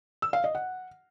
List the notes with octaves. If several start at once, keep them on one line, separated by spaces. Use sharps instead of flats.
E6
F5
D#5
F#5